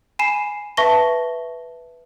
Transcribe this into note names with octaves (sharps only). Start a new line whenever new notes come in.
G#5 B5 C7 E7
B4 E5 A5 C#6 A#6 G7